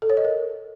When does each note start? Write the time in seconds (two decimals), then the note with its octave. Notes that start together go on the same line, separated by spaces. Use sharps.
0.02 A4
0.10 C#5
0.17 D#5
0.25 A#4